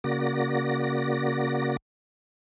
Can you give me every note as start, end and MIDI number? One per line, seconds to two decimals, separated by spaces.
0.04 1.77 49
0.04 1.77 58
0.04 1.77 66
0.04 1.77 74
0.04 1.77 94